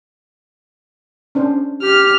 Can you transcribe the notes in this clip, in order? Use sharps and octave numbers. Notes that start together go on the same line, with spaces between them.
C#4 D4 C5
G4 F6